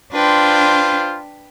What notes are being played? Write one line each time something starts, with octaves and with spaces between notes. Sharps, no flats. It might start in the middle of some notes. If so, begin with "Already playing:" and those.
D4 F4 B4 C5 G5